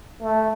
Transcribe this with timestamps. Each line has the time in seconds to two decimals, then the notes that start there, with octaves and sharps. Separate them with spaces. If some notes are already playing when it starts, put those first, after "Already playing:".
0.22 A3